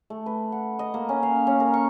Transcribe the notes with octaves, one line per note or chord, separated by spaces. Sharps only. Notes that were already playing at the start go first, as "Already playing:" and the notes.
A3
B4
F#5
D#5
A#3
C#4
F5
C#4
A#4
C#6